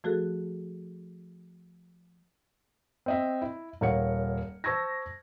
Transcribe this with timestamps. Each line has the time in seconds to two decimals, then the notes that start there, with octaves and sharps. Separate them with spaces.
0.04 F3 A3 F#4 G#4 A4 F#6
3.06 C4 D#5 E5
3.42 E4
3.81 D#1 A#4 C#5 F5 F#5 C#7
4.64 C5 A5 C#6 E6 G#6 A#6